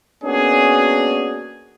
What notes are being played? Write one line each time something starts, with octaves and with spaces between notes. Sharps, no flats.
A#3 B3 C#4 D4 F#4 G#4